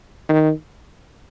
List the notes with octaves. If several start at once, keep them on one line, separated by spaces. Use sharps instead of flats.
D#3